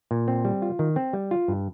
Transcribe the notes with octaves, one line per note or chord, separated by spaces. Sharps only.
A#2
C4
G3
F4
D#3
C4
G3
F4
G2